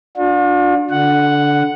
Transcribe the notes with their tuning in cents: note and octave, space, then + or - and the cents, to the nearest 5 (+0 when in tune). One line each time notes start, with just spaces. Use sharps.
D4 +0 F4 +45
D3 -15 F#5 +0